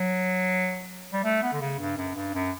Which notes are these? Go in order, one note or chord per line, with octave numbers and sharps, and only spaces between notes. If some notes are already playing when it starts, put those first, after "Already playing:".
Already playing: F#3
G3
A3
B3
D3
C#3
G2
F#2
G2
F#2